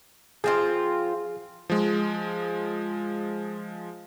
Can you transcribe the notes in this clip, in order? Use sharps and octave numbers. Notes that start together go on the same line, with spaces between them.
F3 C4 F4 G#4
F3 G#3